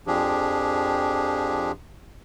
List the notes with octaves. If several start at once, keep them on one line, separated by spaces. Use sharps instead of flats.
F2 F3 D4 G4 G#4